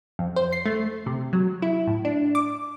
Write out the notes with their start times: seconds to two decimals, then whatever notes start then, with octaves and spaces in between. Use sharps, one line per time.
0.19 F2
0.36 C5
0.52 C7
0.66 A3
1.06 C3
1.33 F#3
1.62 E4
1.87 A2
2.05 D4
2.35 D6